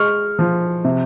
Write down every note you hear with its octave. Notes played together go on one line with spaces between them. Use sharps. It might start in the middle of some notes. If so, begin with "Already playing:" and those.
Already playing: G#3 C#6 F6
F3
C3